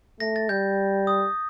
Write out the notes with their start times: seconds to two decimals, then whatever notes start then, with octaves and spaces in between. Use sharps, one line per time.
0.20 A3 A#6
0.36 A6
0.49 G3 G6
1.07 D#6